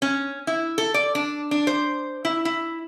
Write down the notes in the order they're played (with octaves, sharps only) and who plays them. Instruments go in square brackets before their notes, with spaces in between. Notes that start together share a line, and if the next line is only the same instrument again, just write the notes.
[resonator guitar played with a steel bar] C#4
E4
A4
D5
D4
D4
C5
E4
E4